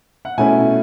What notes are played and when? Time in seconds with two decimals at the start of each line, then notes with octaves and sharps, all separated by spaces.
0.25 F#5
0.37 B2 A3 C#4 E4 G#5